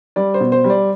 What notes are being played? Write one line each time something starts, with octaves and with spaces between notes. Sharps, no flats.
G3 D5
C5
B2
C5
G3
D5